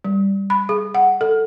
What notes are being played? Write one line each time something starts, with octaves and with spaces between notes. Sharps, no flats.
G3
B5
G#4
F#5
A4